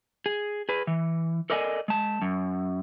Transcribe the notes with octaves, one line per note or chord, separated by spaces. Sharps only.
G#4
G#4 B4
E3
A4 A#4 D5 D#5 F#5 G#5
G#3 A5
F#2